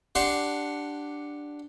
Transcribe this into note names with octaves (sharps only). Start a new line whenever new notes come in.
D4 G4 F#5 C6 C#6